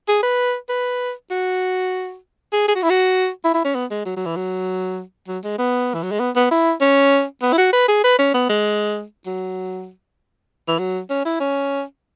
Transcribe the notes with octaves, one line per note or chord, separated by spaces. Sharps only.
G#4
B4
B4
F#4
G#4
G#4
F#4
E4
F#4
E4
E4
C#4
B3
G#3
F#3
F#3
E3
F#3
F#3
G#3
B3
E3
F#3
G#3
B3
B3
E4
C#4
B3
E4
F#4
B4
G#4
B4
C#4
B3
G#3
F#3
E3
F#3
C#4
E4
C#4